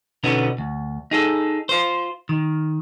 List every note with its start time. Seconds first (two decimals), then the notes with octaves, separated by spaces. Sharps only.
0.24 B2 D3 B3 C#4 D#4
0.58 D2
1.11 D#4 G#4 A4
1.69 F4 C5
2.29 D#3